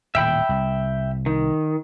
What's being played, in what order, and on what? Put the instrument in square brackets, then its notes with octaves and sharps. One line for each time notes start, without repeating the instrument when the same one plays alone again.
[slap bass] D#1 A2 [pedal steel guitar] E5 G5 B5
[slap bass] C2
[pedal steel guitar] D#3